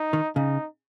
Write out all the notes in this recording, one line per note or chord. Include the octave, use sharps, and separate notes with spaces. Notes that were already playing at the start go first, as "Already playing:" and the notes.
Already playing: D#4
D#3
C#3 D#4